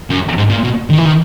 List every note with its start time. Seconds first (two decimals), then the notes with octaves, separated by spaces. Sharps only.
0.10 F#2
0.38 G#2
0.50 A#2
0.64 B2
0.90 D#3
0.98 E3
1.05 D#3